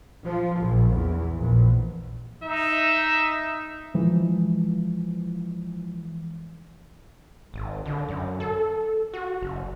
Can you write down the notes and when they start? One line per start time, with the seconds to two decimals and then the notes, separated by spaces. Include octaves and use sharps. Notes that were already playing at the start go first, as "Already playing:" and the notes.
0.25 F3
0.60 A#1
0.93 E2
1.38 A#1
2.43 D#4 E5
3.94 E3 F3 G#3
7.54 G#1
7.86 D3
8.09 F#2
8.40 A4
9.14 F#4
9.41 F#1